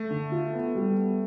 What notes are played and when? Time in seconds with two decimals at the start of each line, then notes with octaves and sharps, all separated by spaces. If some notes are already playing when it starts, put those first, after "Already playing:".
Already playing: A3
0.10 D3
0.32 F4
0.54 B3
0.75 G3
0.96 B3